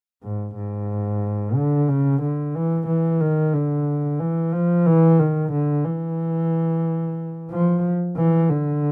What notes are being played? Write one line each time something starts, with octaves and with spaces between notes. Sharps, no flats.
G#2
G#2
D3
C#3
D3
E3
E3
D#3
D3
E3
F3
E3
D#3
D3
E3
F3
E3
D3